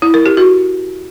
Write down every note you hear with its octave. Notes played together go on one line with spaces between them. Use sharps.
E4
A#4
G4
F#4